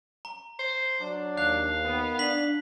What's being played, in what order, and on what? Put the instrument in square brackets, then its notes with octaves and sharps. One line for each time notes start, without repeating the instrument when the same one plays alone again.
[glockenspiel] A#5
[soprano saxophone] C5
[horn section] F#3 D4
[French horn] D#2 [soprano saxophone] F5 [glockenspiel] F#6
[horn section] D#3 B3
[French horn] D4 [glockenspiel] B6 F#7